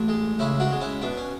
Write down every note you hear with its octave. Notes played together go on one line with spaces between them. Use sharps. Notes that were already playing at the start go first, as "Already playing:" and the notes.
Already playing: A1 D4
G#3
C#2 C#4 E4
D4 F#4
G#3
C#4 E4
B2 D4
C#4